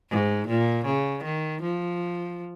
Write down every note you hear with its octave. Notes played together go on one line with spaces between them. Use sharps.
G#2
A#2
C#3
D#3
F3